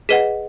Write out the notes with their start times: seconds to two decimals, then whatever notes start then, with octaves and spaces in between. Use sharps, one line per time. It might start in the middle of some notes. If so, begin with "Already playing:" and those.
0.09 G#4 B4 D#5 F#5 B6 D#7